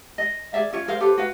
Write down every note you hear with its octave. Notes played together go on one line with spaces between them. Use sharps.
D#5
G#4 D5 E5 F5
C#4 F4 C#5
G#4 A#4 C5 F5
G4 A4 B4 C5
F#4 B4 F5